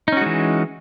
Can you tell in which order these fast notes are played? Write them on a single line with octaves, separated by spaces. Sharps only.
D#4 C#4 F#4 G#3 E3